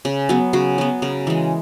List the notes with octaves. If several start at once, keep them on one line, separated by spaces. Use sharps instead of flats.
C#3
F#3 B3
C#3 F#4
F#3 B3
C#3 A#4
E3 G#3